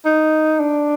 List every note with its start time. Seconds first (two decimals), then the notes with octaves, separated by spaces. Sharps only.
0.05 D#4
0.60 D4